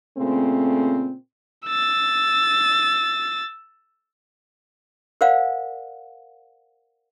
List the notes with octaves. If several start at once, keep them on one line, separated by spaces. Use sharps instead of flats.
A#2 C#3 A3 C4
E6 A6
A#4 C5 D5 F5 F#5